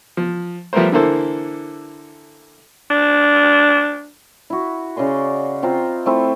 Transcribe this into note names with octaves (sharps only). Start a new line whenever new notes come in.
F3
F3 G3 A3 B3 A#4 C5
D3 E3 A#3 E4 A4 C5
D4
E4 F#4
C#3 D5 D#5 C6
C4 F4 A#5
A3 C4 E4 B4